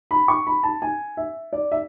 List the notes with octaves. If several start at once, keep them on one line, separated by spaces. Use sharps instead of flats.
B5
C#6
B5
A5
G#5
E5
D5
E5